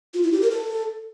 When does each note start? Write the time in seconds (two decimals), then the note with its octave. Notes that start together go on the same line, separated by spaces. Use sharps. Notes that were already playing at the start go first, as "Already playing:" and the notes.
0.14 F4
0.23 E4
0.32 G4
0.41 A#4
0.51 A4